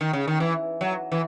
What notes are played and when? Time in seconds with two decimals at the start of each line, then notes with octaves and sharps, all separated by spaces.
0.01 D#3
0.13 C#3
0.28 D#3
0.40 E3
0.81 F#3
1.12 E3